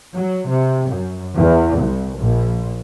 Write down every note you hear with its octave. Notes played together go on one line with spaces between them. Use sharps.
F#3
C3
F#2
E2
C2
A#1